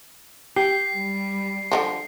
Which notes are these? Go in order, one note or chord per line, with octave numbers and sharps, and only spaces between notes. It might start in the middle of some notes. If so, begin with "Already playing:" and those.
G4 C7
G3
D3 E3 F3